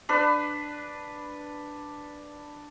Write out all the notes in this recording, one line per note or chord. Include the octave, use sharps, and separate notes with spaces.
D4 B4